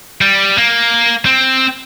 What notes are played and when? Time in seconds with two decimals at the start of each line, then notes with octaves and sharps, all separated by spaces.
0.21 G3
0.58 A#3
1.26 C4